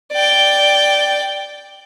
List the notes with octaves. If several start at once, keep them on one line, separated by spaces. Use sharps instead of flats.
D5 G5